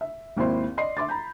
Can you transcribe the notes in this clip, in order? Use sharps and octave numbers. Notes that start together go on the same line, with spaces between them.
E5
G#1 D#2 C4 E4 C5 C6
D5 D#5 C6 C7
E5 C6 D6 A6
A#5 B5 G6